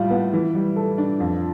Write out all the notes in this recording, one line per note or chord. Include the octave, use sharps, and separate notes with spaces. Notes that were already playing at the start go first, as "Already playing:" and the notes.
Already playing: A2 G3 F4
B3
E3
G3
A4
D4
F2